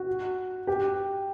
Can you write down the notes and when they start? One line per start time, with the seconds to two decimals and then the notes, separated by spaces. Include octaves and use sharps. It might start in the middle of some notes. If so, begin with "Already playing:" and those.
Already playing: F#4
0.67 G4